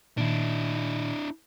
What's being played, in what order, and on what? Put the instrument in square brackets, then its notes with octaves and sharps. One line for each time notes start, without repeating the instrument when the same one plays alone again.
[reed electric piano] A#2 D#3 [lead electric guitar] D4 E4